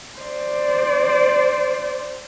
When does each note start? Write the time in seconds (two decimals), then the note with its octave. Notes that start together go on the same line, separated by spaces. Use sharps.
0.19 C5 D5